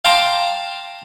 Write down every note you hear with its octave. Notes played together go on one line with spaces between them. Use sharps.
F5 G5 A5 A#5 C6 D6